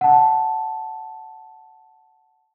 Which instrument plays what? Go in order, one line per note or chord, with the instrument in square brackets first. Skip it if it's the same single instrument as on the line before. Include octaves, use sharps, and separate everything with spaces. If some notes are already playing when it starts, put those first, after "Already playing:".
[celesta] F#5 A5